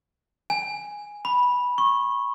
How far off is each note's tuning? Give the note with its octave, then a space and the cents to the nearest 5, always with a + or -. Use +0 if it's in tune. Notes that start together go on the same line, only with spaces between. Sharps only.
G#5 -5
B5 -10
C#6 -20